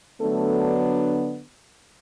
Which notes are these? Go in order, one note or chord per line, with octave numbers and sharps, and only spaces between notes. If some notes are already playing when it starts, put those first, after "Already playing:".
D3 F#3 A3 B3 D4 A4